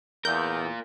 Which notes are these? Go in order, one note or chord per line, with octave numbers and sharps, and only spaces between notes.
E2 F4 A#4 G6